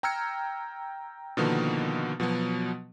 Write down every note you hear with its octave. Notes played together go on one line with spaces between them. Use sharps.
G5 A#5 E6 F6 G#6 C#7
B2 D3 D#3 F3 A#3 B3
B2 F3 F#3 B3